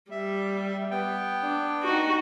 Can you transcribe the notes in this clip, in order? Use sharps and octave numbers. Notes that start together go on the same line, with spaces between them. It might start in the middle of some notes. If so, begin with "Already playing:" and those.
G3 E5
B3 G5
D4
D#4 F#4